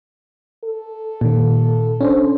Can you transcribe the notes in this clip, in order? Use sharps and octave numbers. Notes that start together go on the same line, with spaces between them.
A4
A#2 D#3
C#4 D4 C5